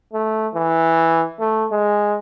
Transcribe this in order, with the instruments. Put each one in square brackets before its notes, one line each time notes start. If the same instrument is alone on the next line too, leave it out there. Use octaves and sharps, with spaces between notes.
[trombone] A3
E3
A3
G#3